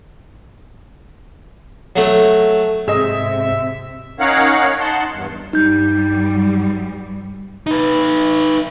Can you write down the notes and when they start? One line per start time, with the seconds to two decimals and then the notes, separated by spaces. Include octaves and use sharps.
1.96 F#3 A3
2.88 G#2 C3 G#4 D#5 E5
4.20 C#4 D#4 A#4 C#5 F5 F#5
4.79 D#4 F#5 A5 C6
5.11 E2 G2
5.53 G2 G3 D#4 G6
7.66 D#4 B4